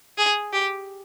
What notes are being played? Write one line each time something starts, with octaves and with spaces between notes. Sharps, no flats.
G#4
G4